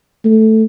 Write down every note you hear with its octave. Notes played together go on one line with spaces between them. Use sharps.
A3